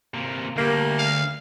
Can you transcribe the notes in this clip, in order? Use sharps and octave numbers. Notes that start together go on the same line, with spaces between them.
C3 A#3
D2 G3 A#3
F5